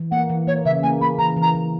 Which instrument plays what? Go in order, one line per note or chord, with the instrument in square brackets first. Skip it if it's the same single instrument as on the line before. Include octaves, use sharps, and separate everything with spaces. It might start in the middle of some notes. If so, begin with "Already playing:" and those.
Already playing: [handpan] E3
[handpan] A#3 [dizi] F#5
[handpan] E3
[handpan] A#3 [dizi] C#5
[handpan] C#3 [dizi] E5
[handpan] A#3 [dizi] G#5
[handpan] A#3 [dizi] B5
[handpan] E3 [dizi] A#5
[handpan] E3
[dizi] A#5
[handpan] E3